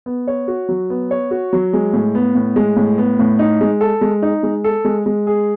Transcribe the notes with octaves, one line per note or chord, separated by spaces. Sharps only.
B3
C#5
F#4
F#3
B3
C#5
F#4
F#3
G#3
A2
B3
A2
G#3
A2
B3
A2
D#4
G#3
A4
G#3
D#4
G#3
A4
G#3
G#3
G#4